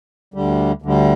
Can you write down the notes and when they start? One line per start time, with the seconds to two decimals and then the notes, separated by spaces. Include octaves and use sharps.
0.34 D2 D3 G3
0.82 D2 D3 G3